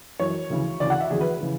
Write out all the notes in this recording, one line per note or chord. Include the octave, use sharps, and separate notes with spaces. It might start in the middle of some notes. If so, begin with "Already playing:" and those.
F#2 E3 C#5
D2 C#3 E3
D2 C#3 E3 D5
F#5
E5
E2 D3 F#3 G#4
B4
C#3 E3